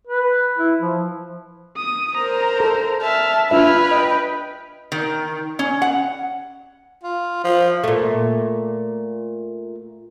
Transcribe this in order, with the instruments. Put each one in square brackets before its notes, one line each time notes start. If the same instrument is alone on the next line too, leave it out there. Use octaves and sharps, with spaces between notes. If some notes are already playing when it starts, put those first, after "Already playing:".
[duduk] B4
E4
F3
[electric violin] D#6
[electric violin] A#4 A#5 [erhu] C5
[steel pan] A4
[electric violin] E5 F6 [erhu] A5
[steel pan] D4 F4 E5 [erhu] B4 [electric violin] F6 G#6
[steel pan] D#5 [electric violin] G5
[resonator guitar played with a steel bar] D#3
C#4
F#5
[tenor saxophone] F4
F3
[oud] A#2 A3